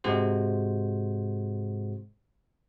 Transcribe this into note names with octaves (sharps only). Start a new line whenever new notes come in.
G#2 C3 G#3 F#4 C5